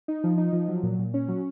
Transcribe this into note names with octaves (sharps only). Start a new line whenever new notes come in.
D#4
F3
D#4
F3
F#3
A#2
A#2
C#4
F#3